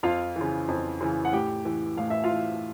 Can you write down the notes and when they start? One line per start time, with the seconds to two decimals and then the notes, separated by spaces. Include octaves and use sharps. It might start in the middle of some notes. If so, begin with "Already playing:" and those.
0.03 F2 F4 F5
0.36 C#3 E3
0.68 F2
1.01 C#3 E3
1.25 F#5
1.33 A2 G4 G5
1.65 E3
1.97 A2 F5
2.10 E5
2.24 F4 F5
2.30 E3